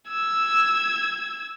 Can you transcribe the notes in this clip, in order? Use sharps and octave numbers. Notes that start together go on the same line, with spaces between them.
E6 G#6